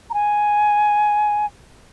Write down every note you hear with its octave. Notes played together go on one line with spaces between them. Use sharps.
A#5
G#5